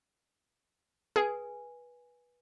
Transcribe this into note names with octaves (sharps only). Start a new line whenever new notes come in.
G#4 B4 G#5